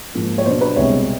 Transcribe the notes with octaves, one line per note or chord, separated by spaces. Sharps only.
G#2 F3 A#3
C#5
B2 F#3 B3 D4 C5
B4
C2 B2 G#3 C#5